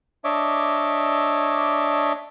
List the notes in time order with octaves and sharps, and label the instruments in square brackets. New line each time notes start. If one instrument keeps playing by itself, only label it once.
[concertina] D4 C#5 D#5 E5 D6